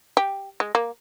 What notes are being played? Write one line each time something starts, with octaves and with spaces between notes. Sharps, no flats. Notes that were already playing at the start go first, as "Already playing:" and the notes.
G4
G#3
A#3